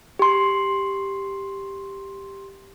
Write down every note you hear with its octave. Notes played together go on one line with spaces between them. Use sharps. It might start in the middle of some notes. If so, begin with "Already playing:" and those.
G4 C6